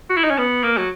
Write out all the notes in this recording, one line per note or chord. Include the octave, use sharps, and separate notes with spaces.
F#4
E4
D#4
C#4
B3
A#3
F#3